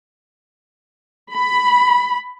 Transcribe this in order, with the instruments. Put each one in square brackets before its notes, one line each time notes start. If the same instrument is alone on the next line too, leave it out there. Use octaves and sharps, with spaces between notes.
[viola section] B5